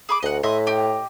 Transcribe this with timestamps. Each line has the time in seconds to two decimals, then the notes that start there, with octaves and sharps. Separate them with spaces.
0.09 G#4 B5 D6
0.22 D2 D#5 F#5
0.43 A2 D#5 E5 C6
0.67 G4 D#5